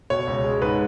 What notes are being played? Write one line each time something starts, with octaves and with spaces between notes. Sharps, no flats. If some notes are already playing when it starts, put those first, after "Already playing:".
B2 C#5
C#2
G#3
G#2 B4